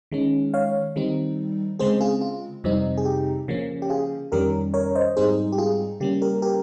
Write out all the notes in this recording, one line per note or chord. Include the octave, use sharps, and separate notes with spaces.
D#3 G#3 C#4
C#5 F5
D#3 G3 C4 D#4
C#3 G#3 C4 G#4 C5
F4 G#4
F4
F2 C3 G3 C4 D#4
G#4
G4
C#3 F3 A#3 C#4
G4
F4 G#4
F2 D#3 G3 C#4 G4 A#4
A#4 C#5
C5 D#5
G#2 G3 C4 D#4 G#4 C5
G4
F4 G#4
C#3 G3 A#3 C#4 G4
G4 A#4
G4 A#4